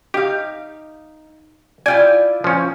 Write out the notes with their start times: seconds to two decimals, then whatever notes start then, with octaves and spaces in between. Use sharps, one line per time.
0.14 D#4 G4 F5
1.86 E4 F4 D5 G5 G#5
2.44 F3 C#4